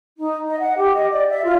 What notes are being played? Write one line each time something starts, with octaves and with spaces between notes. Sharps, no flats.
D#4
D#5
F#5
G4
D#5
D5
E5
F4